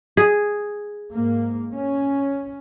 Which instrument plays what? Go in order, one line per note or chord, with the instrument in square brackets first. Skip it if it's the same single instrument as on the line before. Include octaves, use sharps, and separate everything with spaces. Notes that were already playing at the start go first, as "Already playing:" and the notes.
[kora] G#4
[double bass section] G#2 A#3
C#4